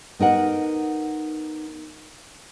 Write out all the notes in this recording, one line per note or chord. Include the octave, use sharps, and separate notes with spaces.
B3 D#4 A#4 F#5